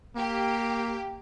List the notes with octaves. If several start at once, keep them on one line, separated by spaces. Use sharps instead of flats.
A#3 G4